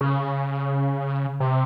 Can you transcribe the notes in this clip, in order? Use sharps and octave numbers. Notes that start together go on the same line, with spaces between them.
C#3
C3